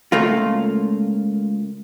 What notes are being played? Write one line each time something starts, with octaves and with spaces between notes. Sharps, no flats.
C#2 A3 A#3 F4